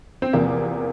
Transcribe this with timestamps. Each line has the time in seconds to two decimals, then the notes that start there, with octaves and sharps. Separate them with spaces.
0.22 C4
0.33 E2 C3 F3 A#3